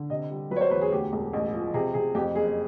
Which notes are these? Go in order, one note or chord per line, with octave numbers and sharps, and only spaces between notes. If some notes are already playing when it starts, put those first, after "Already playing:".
Already playing: D3
C3 D#5
G3
F#3 B4
C#5
C5
E2 B4
G#4
D2 G4
E1
A1
F3
C3 G#4
C3 G#4
F2 G4
F#1 G#4